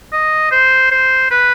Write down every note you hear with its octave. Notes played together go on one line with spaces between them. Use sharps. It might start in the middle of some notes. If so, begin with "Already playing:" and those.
D#5
C5
C5
B4